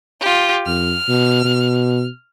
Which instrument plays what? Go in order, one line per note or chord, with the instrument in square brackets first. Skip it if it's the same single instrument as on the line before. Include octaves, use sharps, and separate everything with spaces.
[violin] F4 G4
[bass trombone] F2 [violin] F6
[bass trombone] B2
B2